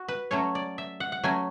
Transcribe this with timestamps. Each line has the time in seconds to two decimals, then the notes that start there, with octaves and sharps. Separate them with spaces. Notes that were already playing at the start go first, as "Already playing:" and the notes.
Already playing: F#4
0.08 B4
0.31 F#3 A3 C#4 C#5
0.55 D5
0.78 E5
1.00 F#5
1.12 F#5
1.23 F#3 A3 C#4 G#5